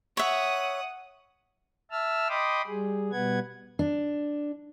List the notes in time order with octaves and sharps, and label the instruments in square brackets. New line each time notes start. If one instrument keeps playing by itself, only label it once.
[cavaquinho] C#5 E5 [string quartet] F#5 D#6
[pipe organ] E5 A5 E6 F6
D#5 G5 B5 C6 D6 D#6
G3 G#4
B2 G3 B3 B4 F#5 G#6
[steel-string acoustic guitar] D4